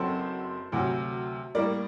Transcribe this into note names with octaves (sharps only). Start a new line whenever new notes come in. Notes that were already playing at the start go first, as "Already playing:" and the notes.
Already playing: F#1 F#2 F#3 C4 A4 C5
D2 C3 F#3
A2 G3 A#3 A#4 D5